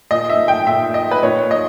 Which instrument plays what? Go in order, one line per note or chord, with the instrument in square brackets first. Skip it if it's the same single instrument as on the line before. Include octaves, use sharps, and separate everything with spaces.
[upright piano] A#2 D#5
E5
G5
A#2 E5
D#5
B4
A#2 C#5
D#5